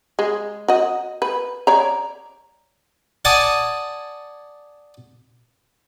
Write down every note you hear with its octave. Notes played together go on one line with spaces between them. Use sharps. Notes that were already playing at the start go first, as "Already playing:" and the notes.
G#3
F#4 D#5
B4
C#5 D5 A#5
D5 F#5 G#5 A5 D#6